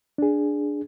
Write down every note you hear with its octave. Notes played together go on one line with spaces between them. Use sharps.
D4 G#4